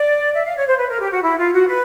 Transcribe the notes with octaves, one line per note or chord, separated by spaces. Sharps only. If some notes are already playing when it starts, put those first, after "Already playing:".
Already playing: D5
E5
F5
C#5
C5
B4
A#4
G4
F#4
E4
F4
F#4
B4